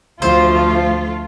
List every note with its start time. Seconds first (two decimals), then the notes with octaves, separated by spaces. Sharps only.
0.22 D2 F3 A3 F4 C5